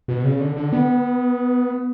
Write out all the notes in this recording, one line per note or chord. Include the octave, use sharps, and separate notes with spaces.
B2
C#3
D3
D3
B3